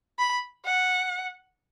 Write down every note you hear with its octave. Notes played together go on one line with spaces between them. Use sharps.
B5
F#5